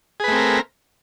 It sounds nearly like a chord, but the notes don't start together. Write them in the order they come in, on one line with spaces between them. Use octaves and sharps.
G#4 B4 A3 C4 A#4